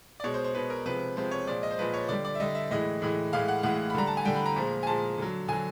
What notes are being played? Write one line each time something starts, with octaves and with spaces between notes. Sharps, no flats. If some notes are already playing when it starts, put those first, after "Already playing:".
D5
B2 G#3 C#5
C5
C5
B2 G#3 B4
A#4
C3 F3 G#3 B4
C3 F3 G#3 C5
C#5
A#2 F3 G#3 D5
D#5
C5
A#2 F3 G#3 B4
C#5
D3 G3 D5
D5
E5
D3 G3 D#5
E5
A2 E3 G#3 D#5
A2 E3 G#3
A2 E3 G#3 F5
F#5
A2 E3 G#3 F#5
B5
D3 G3 A#5
A5
G#5
D3 G3 G5
B5
A#5
A#2 F3 G#3
G#5
A#2 F3 G#3 A5
D3 F#3
D3 F#3 G#5